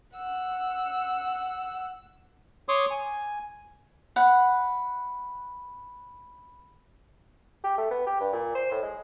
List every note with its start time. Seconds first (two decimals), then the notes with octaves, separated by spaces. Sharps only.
0.15 F#5 E6
2.69 C#5 C6 D6 D#6
2.91 G#5
4.16 B4 F#5
7.64 G4
7.77 A3
7.91 B3
8.07 G4
8.20 G2
8.33 A#2
8.55 C5
8.71 A2
8.83 G#3